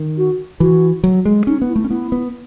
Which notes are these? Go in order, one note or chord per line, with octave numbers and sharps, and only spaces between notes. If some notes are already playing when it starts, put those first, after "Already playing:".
Already playing: D#3
F#4
E3 F#4
F#3
G#3
C#4 D#4
B3
E4
A3
C#4
B3 E4
B3